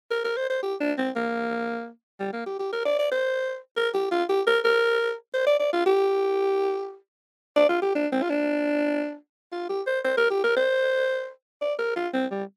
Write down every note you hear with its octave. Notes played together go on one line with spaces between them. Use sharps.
A#4
A#4
C5
C5
G4
D4
C4
A#3
G3
A#3
G4
G4
A#4
D5
D5
C5
A#4
G4
F4
G4
A#4
A#4
C5
D5
D5
F4
G4
D5
F4
G4
D4
C4
F4
D4
F4
G4
C5
C5
A#4
G4
A#4
C5
D5
A#4
F4
C4
G3